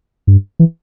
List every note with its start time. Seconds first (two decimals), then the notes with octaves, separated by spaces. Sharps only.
0.27 G2
0.59 E3